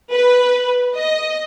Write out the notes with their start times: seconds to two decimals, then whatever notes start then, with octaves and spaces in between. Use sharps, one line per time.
0.12 B4
0.96 D#5